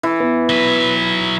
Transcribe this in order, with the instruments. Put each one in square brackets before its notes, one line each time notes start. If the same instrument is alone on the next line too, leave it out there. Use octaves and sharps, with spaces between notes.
[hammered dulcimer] E3
[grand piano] B3
[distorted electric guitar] F#3 B4